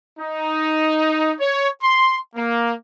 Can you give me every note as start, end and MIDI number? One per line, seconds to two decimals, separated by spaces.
0.18 1.33 63
1.39 1.68 73
1.83 2.16 84
2.35 2.73 58